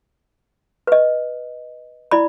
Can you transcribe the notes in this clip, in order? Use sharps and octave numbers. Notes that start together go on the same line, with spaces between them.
B4 D#5
E4 D5 B5